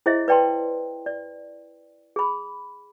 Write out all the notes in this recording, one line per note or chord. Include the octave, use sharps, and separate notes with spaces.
E4 G#4 C5 D#5 E5
B4 D5 G5 A5 C6
D5
G#4 B5